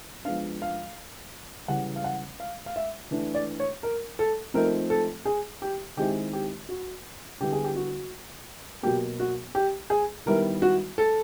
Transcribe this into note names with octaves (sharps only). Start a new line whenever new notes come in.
F3 G#3 B3 D4 F5
F5
C#3 E3 G3 F#5
F5
F#5
F5
F5
E5
E3 A3 D4
D5
C#5
A#4
A4
F3 A3 C4 D#4 A#4
A4
G#4
G4
D#3 G#3 C4 E4 G4
G4
F#4
D3 G3 B3 E4 G4
G#4
G4
F#4
B2 F#3 A#3 G4
F#4
G4
G#4
D#3 G3 B3 E4 A#4
F#4
A4